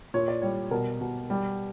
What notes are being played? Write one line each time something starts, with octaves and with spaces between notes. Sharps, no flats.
A#2 C#5
D5
G3 C#5
B2 A#4
B2
G3